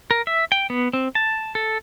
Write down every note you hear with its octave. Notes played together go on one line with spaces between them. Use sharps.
A#4
E5
G5
B3
C4
A5
A4